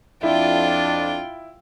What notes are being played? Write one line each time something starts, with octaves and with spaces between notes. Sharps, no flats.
F2 D4 E4 F4 G5